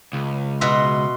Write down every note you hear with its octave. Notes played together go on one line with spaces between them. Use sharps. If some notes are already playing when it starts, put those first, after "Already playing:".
C#2
B2 F#4 E5 C6